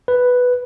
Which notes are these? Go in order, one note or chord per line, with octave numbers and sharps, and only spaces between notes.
B4